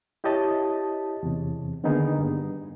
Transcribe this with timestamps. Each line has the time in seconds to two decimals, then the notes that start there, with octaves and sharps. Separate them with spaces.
0.24 E4 G4 C#5 D#5 A5
1.23 E2 C3
1.84 D3 D#3 A#3 B3 D#4 G#4
2.18 G2